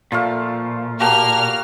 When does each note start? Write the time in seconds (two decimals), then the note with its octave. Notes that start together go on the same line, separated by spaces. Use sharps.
0.12 A#2 F3 A3 F5
1.00 A#3 F#4 G4 F5 A5 A#5 F6